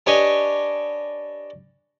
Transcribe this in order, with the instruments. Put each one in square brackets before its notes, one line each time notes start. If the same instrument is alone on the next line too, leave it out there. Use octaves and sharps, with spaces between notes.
[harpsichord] D4 G4 B4 C#5 D#5 G#5